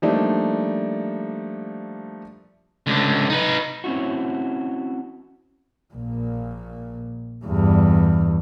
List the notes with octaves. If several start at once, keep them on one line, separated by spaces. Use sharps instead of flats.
F3 G3 A3 A#3 D4 D#4
C#2 D3
D#4 B4
C4 C#4 E4 F#4
A#1 A#2
E2 G2